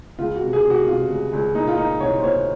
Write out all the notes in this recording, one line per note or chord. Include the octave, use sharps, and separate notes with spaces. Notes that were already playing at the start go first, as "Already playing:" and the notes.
C#2 F4
F#4
C3
G#4
C3
F#4
C3 F4
C#2
C#2
A#2 D#4
F4
A#2 D#4
C2 C#5
C5
A#2 C#5